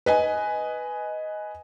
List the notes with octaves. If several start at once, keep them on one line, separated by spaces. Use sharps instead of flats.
B4 D#5 G#5